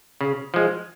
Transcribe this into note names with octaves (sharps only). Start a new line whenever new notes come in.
C#3
F3 G#3